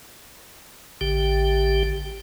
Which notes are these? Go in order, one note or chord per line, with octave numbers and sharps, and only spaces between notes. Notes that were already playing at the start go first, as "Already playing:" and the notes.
A1 D3 G4 G5